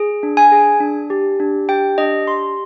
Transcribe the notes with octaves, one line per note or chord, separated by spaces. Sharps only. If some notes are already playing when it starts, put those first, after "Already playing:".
Already playing: G#4
D4
G#5
G#4
D4
G4
D4
G4 G5
D4 D#5
G4 C6